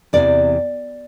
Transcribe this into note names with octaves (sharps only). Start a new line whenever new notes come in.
E2 C3 E3 D5